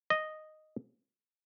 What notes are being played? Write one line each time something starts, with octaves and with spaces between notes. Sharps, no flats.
D#5